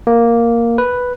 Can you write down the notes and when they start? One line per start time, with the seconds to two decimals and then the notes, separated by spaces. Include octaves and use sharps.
0.07 A#3
0.78 B4